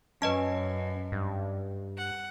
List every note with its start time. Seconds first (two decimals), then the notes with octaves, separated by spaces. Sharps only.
0.22 F#2 C#4 B4 D#5 A5
1.12 G2
1.97 F#5